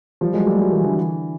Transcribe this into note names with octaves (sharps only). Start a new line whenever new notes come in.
F3 G3
F#3 G#3
G3 A3
F#3 G#3
E3 F#3
D3 E3